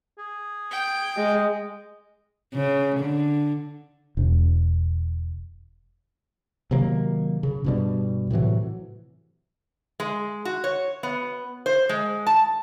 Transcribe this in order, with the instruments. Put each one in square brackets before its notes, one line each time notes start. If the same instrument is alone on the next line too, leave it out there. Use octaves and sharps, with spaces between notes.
[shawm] G#4
[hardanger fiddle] G5
[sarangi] G#3 [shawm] D#5
[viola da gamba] C#3
D3
[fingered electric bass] E1
C3 D#3 F#3 A#3
C#3
G2 B2 G3
A2 C3 E3 F#3
[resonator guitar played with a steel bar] G#3
F#4
C#5
B3
C5
G#3
A5